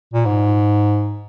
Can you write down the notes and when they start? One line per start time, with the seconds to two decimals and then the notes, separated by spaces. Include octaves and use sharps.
0.13 A#2
0.25 G#2